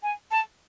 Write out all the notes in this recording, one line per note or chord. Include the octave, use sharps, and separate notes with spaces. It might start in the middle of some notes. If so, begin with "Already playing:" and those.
G#5
A5